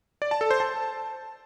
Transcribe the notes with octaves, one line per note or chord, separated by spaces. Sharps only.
D5
A5
A4
C5
A5